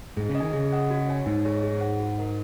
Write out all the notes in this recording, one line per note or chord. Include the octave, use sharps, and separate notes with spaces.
G#2 G#4
C#3
D#5
D#3 G#5
C#3 G#4
D#5 F#5
F#4
C#5 G#5
G#2 D#4
G#4 C#5
G#4
F#5
F#4
A#4 D#5